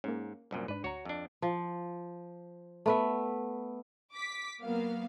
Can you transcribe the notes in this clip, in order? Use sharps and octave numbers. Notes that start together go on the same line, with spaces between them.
G#2 A#3 C#4
C2 F#2 A#2
G#2 D4 B4
D2 F#4 C#5 A#5
F2 D4
F3
A3 B3 E5
D6 B6
F#3 A#3 B3 F5